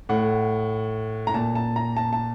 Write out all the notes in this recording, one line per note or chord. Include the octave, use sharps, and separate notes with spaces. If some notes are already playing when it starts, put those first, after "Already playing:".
A2 F#5
A#5
A#2 A5
A5
A#5
A5
A5